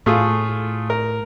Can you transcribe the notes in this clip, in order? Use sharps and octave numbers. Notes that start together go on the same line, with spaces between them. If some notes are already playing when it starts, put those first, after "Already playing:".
A2 A3 F4 G#4
A#4